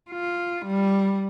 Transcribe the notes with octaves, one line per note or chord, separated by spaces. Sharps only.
F4
G3